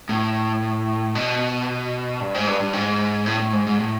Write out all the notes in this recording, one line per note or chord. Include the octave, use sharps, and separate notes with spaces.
A2
B2
G2
G#2
G2
G2
G#2
A2
A2
G#2
G#2
A2